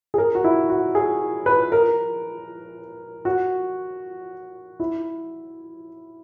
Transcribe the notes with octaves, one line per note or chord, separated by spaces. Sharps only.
G#4
A#4
F#4
E4
F#4
G#4
B4
A#4
F#4
E4